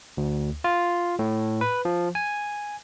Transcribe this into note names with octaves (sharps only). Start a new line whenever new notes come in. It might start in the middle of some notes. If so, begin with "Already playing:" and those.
D2
F4
A2
B4
F3
G#5